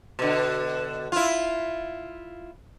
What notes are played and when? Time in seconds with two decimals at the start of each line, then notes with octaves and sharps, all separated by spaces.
0.19 B2 D3
1.12 E4 F4